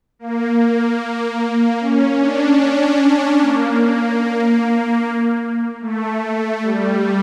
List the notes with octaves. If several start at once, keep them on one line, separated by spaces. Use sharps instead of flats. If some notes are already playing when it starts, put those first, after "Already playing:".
A#3
C#4
D4
C#4
A#3
A3
G3